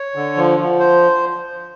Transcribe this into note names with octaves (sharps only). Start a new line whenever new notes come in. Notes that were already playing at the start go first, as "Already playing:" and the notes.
Already playing: C#5
D3
F3
F3
C5